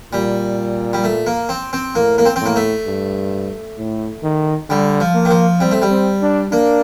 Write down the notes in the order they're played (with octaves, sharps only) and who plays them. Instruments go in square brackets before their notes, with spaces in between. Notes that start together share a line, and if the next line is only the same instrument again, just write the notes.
[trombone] A#2 [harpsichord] G3
[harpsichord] G3
A3
A#3
C4
C4
[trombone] A2 [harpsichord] A#3
[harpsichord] A#3
C4
[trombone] A2 [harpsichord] C4
[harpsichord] A#3
A3
[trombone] G2
A2
D#3
[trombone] D3 [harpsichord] G3
[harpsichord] F3
[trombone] A#3
[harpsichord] D#3
F3
[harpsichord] G3 [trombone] C4
[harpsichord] A3
G3
[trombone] C4
D4
[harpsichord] A#3 [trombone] D4